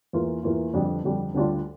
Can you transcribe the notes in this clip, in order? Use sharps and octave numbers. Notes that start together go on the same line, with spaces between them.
E2 E3 A#3 F4
E2 E3 A#3 F4
F2 D3 G3 D4
F2 D3 G3 D4
D2 D3 G3 D4 F4